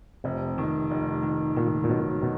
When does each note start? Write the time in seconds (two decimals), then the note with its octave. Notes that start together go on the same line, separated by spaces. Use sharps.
0.24 F1 C3
0.58 D#3
0.91 F1
1.23 D#3
1.57 A#2 D#3
1.84 A#2
1.90 B2 F#3
2.22 B2